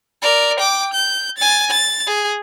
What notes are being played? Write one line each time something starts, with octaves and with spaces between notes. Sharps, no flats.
A#4 D5
G5 D6
G6
G#5 A6
A6
G#4